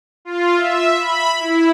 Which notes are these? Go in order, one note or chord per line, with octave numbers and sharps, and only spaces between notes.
F4
E5
B5
E4